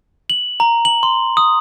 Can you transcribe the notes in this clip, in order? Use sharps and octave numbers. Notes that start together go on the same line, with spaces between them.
F#7
A#5
F#7
C6
D#6